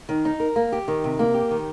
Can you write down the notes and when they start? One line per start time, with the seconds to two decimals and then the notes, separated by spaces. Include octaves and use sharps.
0.09 D#3
0.25 D#4
0.40 A#4
0.56 A#3
0.72 G4
0.88 D#3
1.04 C3
1.19 A#3
1.34 G4
1.51 D#3